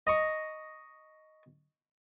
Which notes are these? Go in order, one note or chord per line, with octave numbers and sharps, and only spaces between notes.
D#5 A#5 C#6